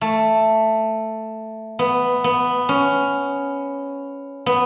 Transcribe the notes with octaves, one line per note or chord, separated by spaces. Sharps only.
A3
B3
B3
C#4
B3